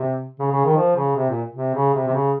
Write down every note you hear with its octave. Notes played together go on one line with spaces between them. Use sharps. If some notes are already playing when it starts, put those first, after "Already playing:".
Already playing: C3
C#3
C#3
D#3
F3
C#3
C3
A#2
C3
C#3
C3
C3
C#3